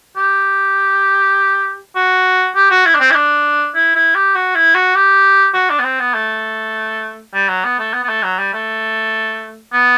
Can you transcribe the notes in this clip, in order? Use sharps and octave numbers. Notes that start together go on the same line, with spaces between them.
G4
F#4
G4
F#4
E4
D4
C4
E4
D4
E4
E4
G4
F#4
E4
F#4
G4
F#4
D4
B3
C4
B3
A3
G3
F#3
B3
A3
B3
B3
A3
F#3
G3
A3
B3